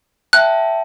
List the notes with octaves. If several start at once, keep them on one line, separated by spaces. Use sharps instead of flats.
E5 G5 A5 F#6